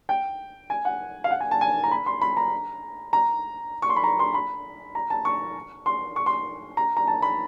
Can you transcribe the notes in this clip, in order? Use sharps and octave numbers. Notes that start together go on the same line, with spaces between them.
G5
G#5
F#5
F5
F#5
G#5
A5
G#5
A#5
B5
C6
B5
A#5
A#5
C#6
C6
B5
A#5
C6
B5
A#5
A5
C#6
C6
C#6
C6
A#5
A#5
A5
B5